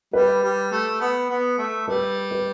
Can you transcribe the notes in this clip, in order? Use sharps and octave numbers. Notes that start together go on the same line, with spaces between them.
G3 B4
G3
A3
B3
B3
A3
G3 B4
B4